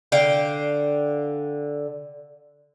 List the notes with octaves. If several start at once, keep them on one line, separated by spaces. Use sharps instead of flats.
D3 F5 G5